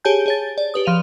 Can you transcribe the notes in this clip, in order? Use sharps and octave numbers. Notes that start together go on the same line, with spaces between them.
G4 G#4 C#5 G#5 A5 G6
G#4 C#5 A6
D5
G4 B4 D#6
F3 F5 D#7 F7